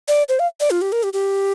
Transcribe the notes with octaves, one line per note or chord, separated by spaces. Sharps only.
D5
C5
F5
D5
F4
G4
A#4
G4
G4